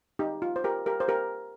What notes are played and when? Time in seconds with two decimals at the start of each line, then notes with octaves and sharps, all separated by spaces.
0.19 D#4 G4
0.42 F4
0.56 C5
0.64 G4 A#4
0.86 G4 A#4
1.00 C5
1.08 G4 A#4